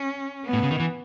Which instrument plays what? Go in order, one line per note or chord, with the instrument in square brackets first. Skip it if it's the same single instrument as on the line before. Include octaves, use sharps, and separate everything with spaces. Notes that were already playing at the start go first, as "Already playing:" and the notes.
Already playing: [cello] C#4
B3
[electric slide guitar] A2
C#3
D#3
E3